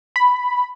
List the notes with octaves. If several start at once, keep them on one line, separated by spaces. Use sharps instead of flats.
B5